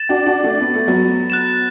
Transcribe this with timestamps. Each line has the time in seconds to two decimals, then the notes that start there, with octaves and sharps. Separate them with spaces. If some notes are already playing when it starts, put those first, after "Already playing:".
Already playing: A6 E7
0.09 D4 F#4
0.26 D4 F#4
0.44 A3 D4
0.61 B3
0.74 A3
0.88 F#3 B3
1.30 F#6 A6 E7